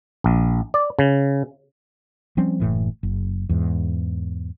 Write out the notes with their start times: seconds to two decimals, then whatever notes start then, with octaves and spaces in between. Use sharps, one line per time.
0.24 A#1
0.74 D5
0.99 C#3
2.37 F3 G3 C4 C#4
2.60 F#1 A2 E3
3.03 F#1
3.49 E2 G#2